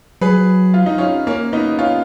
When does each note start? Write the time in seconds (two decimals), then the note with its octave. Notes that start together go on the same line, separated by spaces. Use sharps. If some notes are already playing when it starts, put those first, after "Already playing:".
0.21 F#3 G#4 B4
0.74 F4
0.86 D#4
0.98 C#4 F4
1.27 A#3 C#4
1.53 B3 D#4
1.79 C#4 F4